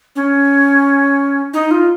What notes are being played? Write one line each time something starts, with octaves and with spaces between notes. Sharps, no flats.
C#4
D#4
F4